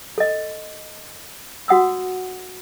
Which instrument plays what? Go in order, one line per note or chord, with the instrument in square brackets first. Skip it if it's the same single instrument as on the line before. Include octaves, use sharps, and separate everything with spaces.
[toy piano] A4 D#5
F#4 F#5 D#6 E6